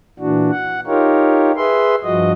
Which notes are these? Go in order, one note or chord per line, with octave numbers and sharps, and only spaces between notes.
A#2 E3 D4 F#4
F#5
D#4 F4 G4 A#4 C#5
G#4 B4 E5 C6
G2 F3 F#4 D#5